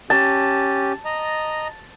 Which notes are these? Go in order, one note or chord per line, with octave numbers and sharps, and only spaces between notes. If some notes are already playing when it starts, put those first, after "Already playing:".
C#4 G4 A5
D#5 A#5